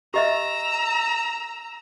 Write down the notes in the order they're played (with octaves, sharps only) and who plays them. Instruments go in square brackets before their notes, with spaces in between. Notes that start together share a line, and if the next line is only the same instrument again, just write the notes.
[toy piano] G4 D#5 E5 [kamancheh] A#5 E6